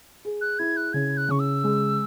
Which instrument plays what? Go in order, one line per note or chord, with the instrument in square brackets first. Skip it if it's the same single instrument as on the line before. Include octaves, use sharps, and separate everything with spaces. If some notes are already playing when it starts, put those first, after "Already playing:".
[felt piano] G#4
[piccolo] F#6
[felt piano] E4 [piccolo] G#6
[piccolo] F#6
[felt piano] C#3 [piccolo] G#6
[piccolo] F#6
[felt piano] C#3 [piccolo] C#6
[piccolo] E6
[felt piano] G#3